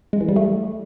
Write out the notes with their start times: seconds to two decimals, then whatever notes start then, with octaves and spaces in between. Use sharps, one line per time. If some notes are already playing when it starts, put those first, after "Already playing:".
0.13 G#3
0.21 E3
0.29 G3
0.36 A3